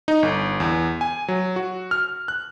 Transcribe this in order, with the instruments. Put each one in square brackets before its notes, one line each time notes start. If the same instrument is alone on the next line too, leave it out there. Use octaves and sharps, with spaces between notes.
[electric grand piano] D#4
G1
E2
G#5
F#3
F#4
F6
F#6